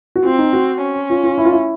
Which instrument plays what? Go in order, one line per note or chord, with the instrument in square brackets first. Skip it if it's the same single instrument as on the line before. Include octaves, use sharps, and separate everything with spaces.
[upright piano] F#4
[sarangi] C4 [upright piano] F4
[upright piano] D#4
F#4
[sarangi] C#4
[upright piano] F4
F4
E4
F4
E4